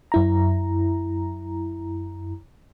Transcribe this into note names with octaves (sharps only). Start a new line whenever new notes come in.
F#2 E4 A#5